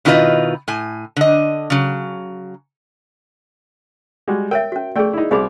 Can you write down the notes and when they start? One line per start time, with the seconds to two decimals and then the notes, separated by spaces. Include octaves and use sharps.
0.05 B2 D#3 E4 F4 B4 D#5
0.68 A2 G#5
1.16 D3 D#5
1.70 C#3 F#3
4.27 G3 G#3 F#4
4.51 A#4 C#5 E5 G5
4.72 C#4 F#4
4.96 A3 G#4 D5 G5
5.13 D#4 E4
5.31 C2 F#4 G#4 D5 B5 D6